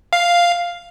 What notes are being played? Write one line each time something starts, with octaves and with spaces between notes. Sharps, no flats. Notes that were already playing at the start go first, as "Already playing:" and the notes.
F5